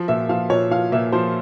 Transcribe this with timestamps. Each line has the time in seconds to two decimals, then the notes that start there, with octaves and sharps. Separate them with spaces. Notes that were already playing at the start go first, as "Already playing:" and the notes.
Already playing: F3
0.08 A#2 E5
0.29 F3 F5
0.50 A#2 C#5
0.71 F3 F5
0.92 A#2 E5
1.12 F3 C5